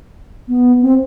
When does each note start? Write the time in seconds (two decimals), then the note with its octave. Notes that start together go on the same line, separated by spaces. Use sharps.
0.48 B3
0.82 C4